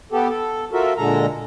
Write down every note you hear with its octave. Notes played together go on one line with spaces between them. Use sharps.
B3 G4 A4
A4
F4 F#4 A4 A#4 E5
A#2 D3 G#3 A4 A#5